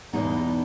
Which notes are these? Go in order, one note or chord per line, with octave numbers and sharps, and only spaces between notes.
E2 B2 G#3 B3 D#4